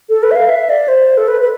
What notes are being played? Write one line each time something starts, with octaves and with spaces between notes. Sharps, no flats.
A4
B4
E5
F5
E5
D5
C5
A4
B4
B4